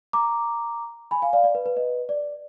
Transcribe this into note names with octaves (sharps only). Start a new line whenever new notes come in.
A#5 D6
G#5 B5
F5 G#5
D5 F5
D5
B4
B4
B4 D#5
D5